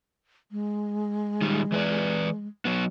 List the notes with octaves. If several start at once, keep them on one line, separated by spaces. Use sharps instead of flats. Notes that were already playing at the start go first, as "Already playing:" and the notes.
G#3
D#3 G3
E3 B4 D5
F#3 B3